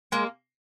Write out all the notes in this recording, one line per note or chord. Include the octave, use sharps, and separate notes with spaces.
G#3 A#3